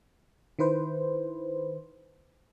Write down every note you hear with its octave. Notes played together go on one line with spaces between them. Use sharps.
D#3 E4 B4 C5